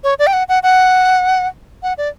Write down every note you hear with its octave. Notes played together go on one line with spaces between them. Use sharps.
C#5
D5
G5
F#5
F#5
F#5
F#5
D5